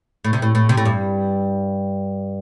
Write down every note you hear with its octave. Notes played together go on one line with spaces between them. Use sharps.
A2
C3
A2
A2
C3
A2
G2